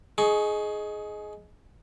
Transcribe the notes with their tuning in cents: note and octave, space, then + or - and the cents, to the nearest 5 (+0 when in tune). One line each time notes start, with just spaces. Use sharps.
D#4 +0 G#4 +20 C#6 +0